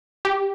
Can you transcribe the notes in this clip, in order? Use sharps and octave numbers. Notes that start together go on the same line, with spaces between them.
G4